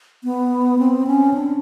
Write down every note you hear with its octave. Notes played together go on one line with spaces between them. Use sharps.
B3
C4
C#4
D4